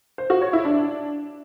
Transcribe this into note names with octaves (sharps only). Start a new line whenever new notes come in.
C5
F#4
C#5
E4
D4